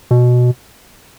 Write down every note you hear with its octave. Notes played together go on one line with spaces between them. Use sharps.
B2